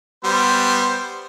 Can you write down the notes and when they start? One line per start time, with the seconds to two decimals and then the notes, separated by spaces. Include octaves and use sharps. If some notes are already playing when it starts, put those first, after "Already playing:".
0.24 G3 B3 C5